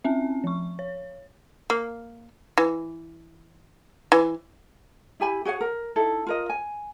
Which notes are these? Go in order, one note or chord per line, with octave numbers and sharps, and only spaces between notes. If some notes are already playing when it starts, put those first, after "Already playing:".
C4 C#4 E5
F3 C#6
C#5
A#3
E3
E3
E4 G4 G#5 B5
F#4 G#4 C#5 F#5
A#4
D#4 E4 A4
F4 A#4 D#5
G#5